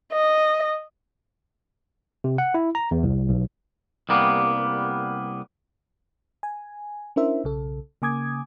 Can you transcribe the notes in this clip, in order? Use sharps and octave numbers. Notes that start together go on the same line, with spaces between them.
D#5
C3
F#5
E4
A#5
E2
C2
B1
C2 G3 A#3 B3
G#5
C#4 D4 E4 A#4 C5 E5
B1 C#3 A4
C#3 A#3 G#5 D6 D#6 G#6